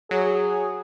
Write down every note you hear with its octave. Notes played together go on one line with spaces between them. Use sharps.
F#3 G#4